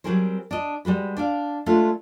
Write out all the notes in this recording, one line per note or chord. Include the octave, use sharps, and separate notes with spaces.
F#3 G3 C4 G#4 A#4 C5
D4 D#5
G3 G#3 F#4 B4
D4 D5 F5
G#3 A3 D4 F4